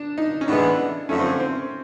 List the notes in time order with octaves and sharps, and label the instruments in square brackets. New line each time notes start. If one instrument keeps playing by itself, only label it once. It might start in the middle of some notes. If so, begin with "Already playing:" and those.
Already playing: [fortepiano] D4
D#4
C#4
[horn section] A2 E3 G#3 B3 [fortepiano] D4
[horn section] F#2 D3 F3 A3 [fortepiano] C#4
[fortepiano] C4
C4